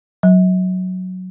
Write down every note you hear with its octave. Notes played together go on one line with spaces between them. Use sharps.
F#3